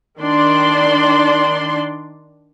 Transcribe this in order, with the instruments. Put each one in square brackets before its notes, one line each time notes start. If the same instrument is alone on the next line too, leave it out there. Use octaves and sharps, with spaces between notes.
[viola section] D#3 D4 D5 C6